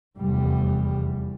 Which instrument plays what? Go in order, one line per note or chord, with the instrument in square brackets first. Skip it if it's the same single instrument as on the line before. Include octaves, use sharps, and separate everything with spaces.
[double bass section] F1 E2 G3